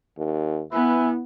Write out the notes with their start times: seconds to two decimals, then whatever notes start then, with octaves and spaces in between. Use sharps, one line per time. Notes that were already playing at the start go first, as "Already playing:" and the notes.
0.17 D#2
0.73 B3 E4 B4 E5 G#5